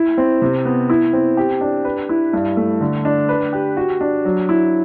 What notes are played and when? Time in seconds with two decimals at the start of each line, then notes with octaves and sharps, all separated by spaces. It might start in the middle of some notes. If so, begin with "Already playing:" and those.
Already playing: E4
0.18 C4
0.42 C3
0.65 B3
0.89 E4
1.13 C4
1.37 G4
1.61 D4
1.85 B4
2.09 E4
2.33 G2
2.57 A3
2.81 D3
3.05 D4
3.29 B4
3.53 G4
3.77 F#4
4.01 D4
4.25 F#3
4.49 E4